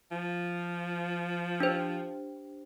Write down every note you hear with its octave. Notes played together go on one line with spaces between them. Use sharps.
F3
D4 G4 C5